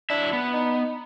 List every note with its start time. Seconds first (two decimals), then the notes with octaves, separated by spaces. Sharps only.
0.10 F#3 D4 E4 E5
0.33 B3
0.54 D#4